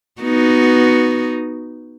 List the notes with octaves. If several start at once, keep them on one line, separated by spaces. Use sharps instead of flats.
B3 D#4 F#4